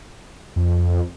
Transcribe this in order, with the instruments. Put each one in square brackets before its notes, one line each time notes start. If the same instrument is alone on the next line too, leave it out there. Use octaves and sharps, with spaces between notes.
[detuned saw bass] F2